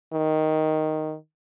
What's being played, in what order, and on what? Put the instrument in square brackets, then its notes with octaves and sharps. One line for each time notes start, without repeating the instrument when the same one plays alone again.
[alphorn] D#3